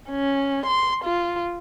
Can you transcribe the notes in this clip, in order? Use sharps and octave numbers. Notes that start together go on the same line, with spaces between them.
C#4
C6
F4